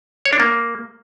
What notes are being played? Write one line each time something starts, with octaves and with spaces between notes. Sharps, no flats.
C#5
D4
A#3